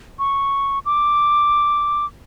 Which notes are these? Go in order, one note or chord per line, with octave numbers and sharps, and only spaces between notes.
C#6
D6